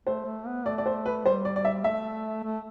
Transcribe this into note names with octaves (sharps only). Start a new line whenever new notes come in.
A3 C5
A3
B3
A3 D5
D5
C5
B4
G3 C5
D5
D5
E5
A3 E5
A3